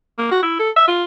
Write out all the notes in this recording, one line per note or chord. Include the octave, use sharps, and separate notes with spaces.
A#3
F#4
E4
A4
E5
F4